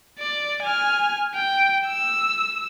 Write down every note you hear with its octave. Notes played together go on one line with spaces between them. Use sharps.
D5
G#5 F6
G5
E6